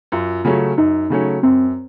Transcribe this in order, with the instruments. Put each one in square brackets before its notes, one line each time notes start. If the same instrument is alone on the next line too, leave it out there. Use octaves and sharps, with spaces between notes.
[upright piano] F#2 [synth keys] F4
[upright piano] C#3 F#3 A3 C#4
[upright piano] F#2 [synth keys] D#4
[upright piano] C#3 F#3 A3 C#4
[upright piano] F#2 [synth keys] C4